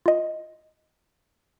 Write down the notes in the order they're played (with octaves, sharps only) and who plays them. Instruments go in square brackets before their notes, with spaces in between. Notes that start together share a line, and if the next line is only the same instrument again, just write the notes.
[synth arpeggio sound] F4 D#5